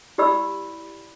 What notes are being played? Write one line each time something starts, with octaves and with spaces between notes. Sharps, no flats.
E4 G4 D5 B5 E6